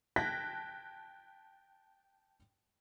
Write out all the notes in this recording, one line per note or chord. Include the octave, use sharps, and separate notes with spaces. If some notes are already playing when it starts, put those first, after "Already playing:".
G5 A5 F#6 G#6 A#6 B6